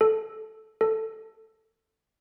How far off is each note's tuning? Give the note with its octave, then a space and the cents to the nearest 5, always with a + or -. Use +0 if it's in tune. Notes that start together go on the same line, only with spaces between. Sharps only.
A4 -10
A4 +10